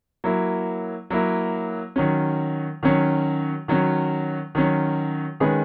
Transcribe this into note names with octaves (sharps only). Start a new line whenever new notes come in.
F#3 A#3 E4
F#3 A#3 E4
D#3 F#3 C#4
D#3 F#3 C#4
D#3 F#3 C#4
D#3 F#3 C#4
D#3 G#3 C#4 G#4 B4